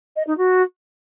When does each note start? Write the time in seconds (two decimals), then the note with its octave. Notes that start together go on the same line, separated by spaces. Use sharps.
0.16 D#5
0.27 D#4
0.38 F#4